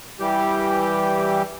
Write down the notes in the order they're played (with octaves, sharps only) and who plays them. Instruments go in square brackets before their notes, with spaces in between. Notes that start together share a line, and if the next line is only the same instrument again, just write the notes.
[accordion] E3 G3 G4